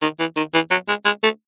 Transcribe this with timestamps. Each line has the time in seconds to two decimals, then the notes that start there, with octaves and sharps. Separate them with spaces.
0.02 D#3
0.20 E3
0.37 D#3
0.54 E3
0.71 F#3
0.88 G#3
1.05 G#3
1.23 A3